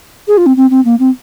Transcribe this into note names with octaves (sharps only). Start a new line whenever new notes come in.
G#4
F4
C4
C4
C4
A#3
C4